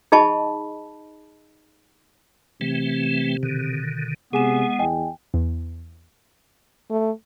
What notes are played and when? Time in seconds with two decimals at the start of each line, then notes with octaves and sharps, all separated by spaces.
0.12 D#4 G#4 D#5 A5 B5 C#6
2.61 C3 E3 A3 C4
3.43 B2 D3 D#3
4.33 C3 G#3 B3 G#4 G#5 E7
4.79 E2 D#5 G5 G#5
5.34 E2
6.90 A3